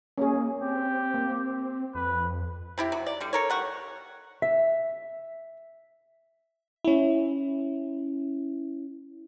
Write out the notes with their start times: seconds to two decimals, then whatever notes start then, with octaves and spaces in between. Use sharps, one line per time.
0.18 A#3 C#4 G#4
0.62 C4 G4
1.14 A#3
1.95 F2 B4
2.78 C3 E4 G4
2.92 F#3
3.06 D5
3.20 D3 G3
3.33 A4 A#4 C#5
3.50 G3 F#5 C#6
4.42 E5
6.85 C#4 E4